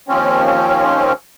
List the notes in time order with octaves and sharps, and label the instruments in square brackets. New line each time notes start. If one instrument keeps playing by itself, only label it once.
[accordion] D#2 F3 C4 C#4